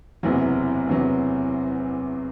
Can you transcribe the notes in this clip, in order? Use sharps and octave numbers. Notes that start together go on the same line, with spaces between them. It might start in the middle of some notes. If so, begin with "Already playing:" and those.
F#1 E2 C3 F#3
F#1 E2 C3 F#3